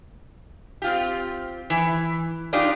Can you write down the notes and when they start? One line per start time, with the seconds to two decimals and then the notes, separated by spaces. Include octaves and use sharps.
0.82 C4 F4 G4
1.70 E3
2.53 D4 D#4 F4 G4